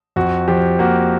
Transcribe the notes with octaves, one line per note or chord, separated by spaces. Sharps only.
F2 F#4
F3 G4
A#3 F#4